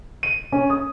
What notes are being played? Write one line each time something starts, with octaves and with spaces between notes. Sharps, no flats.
D#7
C#4
D#6